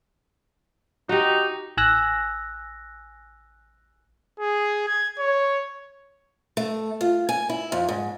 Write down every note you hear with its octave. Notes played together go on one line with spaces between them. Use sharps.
D#4 F#4 G4
A1 G#5 E6 F#6 A#6
G#4
G#6
C#5
A3
F4
G#5
E4
F2
G#2